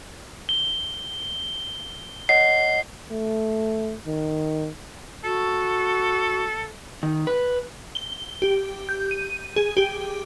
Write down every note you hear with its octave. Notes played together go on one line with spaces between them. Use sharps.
G7
C#5 D#5 F#5 C7
A3
D#3
F#4 A4
D#3
B4
G7
G4
G6
D#7
G#4
G4